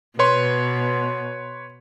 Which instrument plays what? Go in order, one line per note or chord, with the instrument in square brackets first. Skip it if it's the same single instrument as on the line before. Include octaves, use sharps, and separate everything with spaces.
[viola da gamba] B2 [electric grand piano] B4 C#5 C6